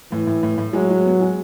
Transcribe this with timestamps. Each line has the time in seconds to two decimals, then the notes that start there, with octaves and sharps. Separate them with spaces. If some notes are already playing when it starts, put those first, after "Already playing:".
0.12 A2 E3
0.27 A2
0.43 A2
0.58 A2
0.73 F#3 G#3
0.90 G#3
1.05 B3
1.20 G#3